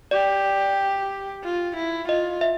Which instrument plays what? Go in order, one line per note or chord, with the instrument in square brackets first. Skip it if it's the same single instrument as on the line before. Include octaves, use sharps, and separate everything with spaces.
[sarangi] G4 [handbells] D5
[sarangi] F4
E4
[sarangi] F4 [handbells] D#5
[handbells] E5